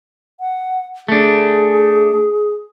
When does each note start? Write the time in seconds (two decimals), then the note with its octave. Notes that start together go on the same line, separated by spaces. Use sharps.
0.40 F#5
1.08 A3 D4 G#4